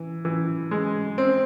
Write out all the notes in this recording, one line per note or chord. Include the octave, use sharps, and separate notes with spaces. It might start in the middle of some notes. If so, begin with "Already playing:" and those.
Already playing: E3
E3
G#3
C4